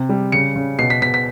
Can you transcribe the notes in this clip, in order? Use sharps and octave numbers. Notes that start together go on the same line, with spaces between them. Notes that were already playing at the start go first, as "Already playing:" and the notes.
Already playing: C3
G3
C#3 C#7
C#3
B2 C7
B6
B2 B6
B6